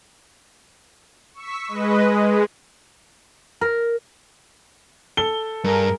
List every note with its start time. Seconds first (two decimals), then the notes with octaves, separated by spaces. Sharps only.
1.34 C#6 E6 B6
1.68 G#3 B4 D#5
2.11 G#3
3.61 A#4
5.17 A4 G7
5.64 G2 G#4 A#4